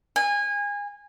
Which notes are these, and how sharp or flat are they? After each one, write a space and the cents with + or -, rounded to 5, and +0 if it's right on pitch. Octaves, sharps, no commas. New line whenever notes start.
G#5 -25